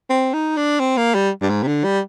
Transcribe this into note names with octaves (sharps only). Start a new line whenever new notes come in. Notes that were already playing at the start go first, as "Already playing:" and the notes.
C4
D#4
D4
C4
A#3
G3
G2
G#2
C3
D3
G3